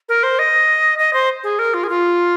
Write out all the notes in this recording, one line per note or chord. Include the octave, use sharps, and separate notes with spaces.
A#4
C5
D#5
D#5
C5
G#4
A#4
F4
G#4
F4